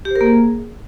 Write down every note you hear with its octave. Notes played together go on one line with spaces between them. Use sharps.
G4
C5
A#4
A#3
G#4